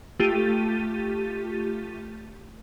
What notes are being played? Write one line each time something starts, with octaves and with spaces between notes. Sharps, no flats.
A3 F4 G4 A6 D#7